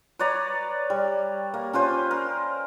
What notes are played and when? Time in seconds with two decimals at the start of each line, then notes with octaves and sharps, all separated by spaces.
0.19 B4 C#5 D5 A#5
0.90 G3
1.54 A#3
1.73 C#4 F4 B4 C5
2.11 A#4